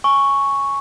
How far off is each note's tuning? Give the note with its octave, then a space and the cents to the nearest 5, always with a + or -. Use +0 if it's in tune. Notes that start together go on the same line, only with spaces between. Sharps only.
G#5 +0 C#6 +0